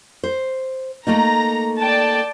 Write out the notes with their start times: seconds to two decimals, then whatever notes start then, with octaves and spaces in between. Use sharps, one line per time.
0.24 C5
1.07 A3 A#3 D#4 A#5
1.79 D5 G5 A5